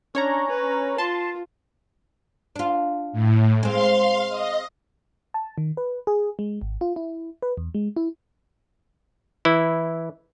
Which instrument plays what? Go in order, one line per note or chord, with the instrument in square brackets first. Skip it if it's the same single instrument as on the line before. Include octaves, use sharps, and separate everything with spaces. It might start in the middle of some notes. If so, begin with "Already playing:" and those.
[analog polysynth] C#4 C#5 A#5 [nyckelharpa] D4
[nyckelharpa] B4
[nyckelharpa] F4 [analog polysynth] A5 C6
[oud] D4 F4
[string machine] A2
[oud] G#3 C4 [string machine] F5 C6
[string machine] D#5
[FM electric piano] A5
D#3
B4
G#4
G#3
G#1
F4
E4
B4
E2
G#3
E4
[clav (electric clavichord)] E3 E4